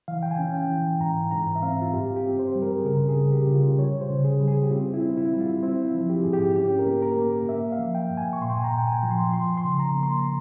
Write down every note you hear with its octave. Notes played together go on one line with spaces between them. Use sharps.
E3 F5
G5
G#5
C#4
G5
E3
G#2 A#5
G#2 A#5
E5
C4 F5
F4
G2 G4
G4
C4
C5
G3
A#4
G#4
C#3 A#4
G#4
C#3
G4
C#3
F4
G3 C#5
C5
C#3
G#4
G3
G#4
G4
C4 F4
E4
C4
E4
G3
F4
C4 E4
F4
F3
G4
G#2 G#4
G4
C#4 G4
A#4
A#3
A#4
A#3
A#3 E5
F5
F3
G5
G2
G#5
C#6
A#2 C6
G5
G#5
A#5
A#2
G5
G#5
F3
C6
F3 C6
C6
C#3
A#5
A#3
C6